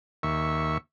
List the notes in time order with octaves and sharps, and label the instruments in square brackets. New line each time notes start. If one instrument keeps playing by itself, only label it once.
[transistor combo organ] D#2 E5 C#6